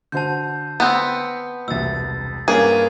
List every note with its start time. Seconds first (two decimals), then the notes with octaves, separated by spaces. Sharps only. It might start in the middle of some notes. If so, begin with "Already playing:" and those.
0.12 D3 F#4 C5 A5 G6
0.80 B3 C4
1.68 E1 C2 E6 A6
2.48 G2 A#3 C#4 G#4 B4